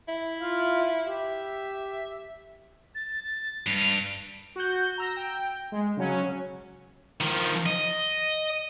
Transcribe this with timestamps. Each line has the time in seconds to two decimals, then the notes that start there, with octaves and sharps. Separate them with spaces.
0.08 E4
0.41 F4 F5
1.07 G4 E5
2.95 A6
3.24 A6
3.66 G2 F7
4.56 F#4 G6
4.98 A#5 E6 A#6
5.17 G5
5.72 G#3
5.97 C#3 F#3 C#4
7.20 D#3 F3
7.66 D#5